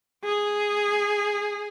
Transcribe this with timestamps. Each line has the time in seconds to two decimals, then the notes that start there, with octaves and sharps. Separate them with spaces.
0.24 G#4